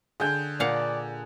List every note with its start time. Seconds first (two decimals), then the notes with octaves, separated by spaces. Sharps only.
0.20 D3 G#4 G5
0.60 A#2 D5 F5 F#5